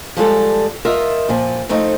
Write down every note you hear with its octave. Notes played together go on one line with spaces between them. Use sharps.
F3 G3 G#3 A4
F4 A#4 D#5 E5
A#2 F3
F2 A3 C4 D#4